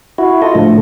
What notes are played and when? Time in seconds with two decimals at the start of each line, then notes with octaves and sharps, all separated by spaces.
0.18 E4 F#4
0.42 F4 A4 D#5
0.55 A2 D3 F3 A3